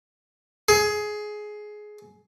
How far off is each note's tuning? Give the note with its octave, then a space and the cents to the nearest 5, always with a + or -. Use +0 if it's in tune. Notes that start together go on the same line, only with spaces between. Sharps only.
G#4 +15